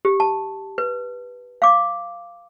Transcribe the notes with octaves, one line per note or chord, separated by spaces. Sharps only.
G4
A5
B4
F5 D6